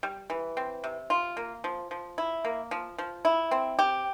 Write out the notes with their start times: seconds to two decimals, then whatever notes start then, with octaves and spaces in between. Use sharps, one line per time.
0.03 G3
0.30 E3
0.57 C4
0.84 C3
1.10 F4
1.37 A#3
1.64 F3
1.91 F3
2.18 E4
2.45 A#3
2.71 F3
2.98 F3
3.25 E4
3.51 C4
3.79 G4